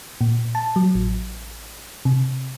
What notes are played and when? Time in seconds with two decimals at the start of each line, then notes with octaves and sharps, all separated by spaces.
0.21 A#2
0.55 A5
0.76 F#3
0.95 A1
2.05 C3